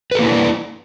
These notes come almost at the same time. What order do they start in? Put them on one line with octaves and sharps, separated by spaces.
B4 A4 A#3 E4 D4